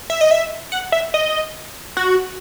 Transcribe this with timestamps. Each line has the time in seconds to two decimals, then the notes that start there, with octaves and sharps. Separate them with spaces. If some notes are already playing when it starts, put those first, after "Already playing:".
0.10 E5
0.21 D#5
0.31 E5
0.72 F#5
0.92 E5
1.14 D#5
1.97 F#4